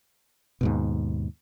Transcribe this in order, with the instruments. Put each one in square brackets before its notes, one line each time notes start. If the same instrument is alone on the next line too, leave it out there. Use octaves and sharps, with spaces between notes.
[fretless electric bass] D#2 G#2 B2